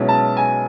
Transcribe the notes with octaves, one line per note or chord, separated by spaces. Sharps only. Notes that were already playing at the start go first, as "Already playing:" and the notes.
Already playing: B1 B2 G#3 C#4 E4
A5
G#5